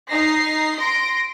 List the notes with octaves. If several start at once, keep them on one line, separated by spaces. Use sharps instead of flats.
D#4 A#6 C7
C6 A#6 D7